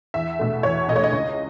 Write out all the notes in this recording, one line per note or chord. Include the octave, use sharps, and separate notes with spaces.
E2 E5
B2 A3
E2 C#5
B2 A3 C#5 D#5
D#5
C#2